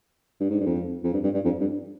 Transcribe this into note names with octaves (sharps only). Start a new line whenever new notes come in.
G2
G#2
G2
F2
F2
G2
G2
G2
F2
G2